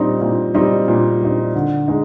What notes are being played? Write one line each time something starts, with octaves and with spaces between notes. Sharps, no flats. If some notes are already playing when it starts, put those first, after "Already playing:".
Already playing: A#2 G3 C4 D#4
A#2
G3 C4 D#4
A#2
G3 C4 D#4
D3
G#3 D#4